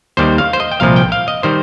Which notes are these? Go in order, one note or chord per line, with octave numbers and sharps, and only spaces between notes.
D#2 D#3 G3 C5
F5
C5
D#5
G5
C2 A#2 F3 F5
G5
F5
D#5
D#3 G3 C5